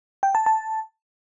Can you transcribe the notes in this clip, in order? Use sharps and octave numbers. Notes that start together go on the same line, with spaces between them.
G5
A5
A5